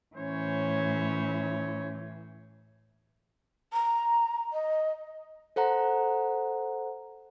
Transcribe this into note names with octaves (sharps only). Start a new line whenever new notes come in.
A2 E3 C#4 C5 C#5
A#5
D#5
A4 C5 F#5 A#5